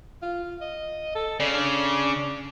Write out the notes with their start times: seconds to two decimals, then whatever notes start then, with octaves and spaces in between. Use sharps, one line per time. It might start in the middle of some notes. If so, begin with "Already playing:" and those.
0.22 F4
0.61 D#5
1.15 A4
1.40 C#3 D5
1.54 D4